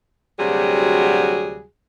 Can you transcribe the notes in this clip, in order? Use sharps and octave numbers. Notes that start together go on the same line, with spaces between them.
D2 C3 F#3 G3 F#4 G#4